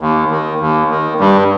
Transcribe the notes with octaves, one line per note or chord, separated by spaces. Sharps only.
D#2
D#3
D#2
D#3
G2 G3